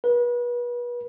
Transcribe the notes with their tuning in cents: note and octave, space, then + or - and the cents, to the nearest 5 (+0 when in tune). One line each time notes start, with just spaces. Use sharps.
B4 -35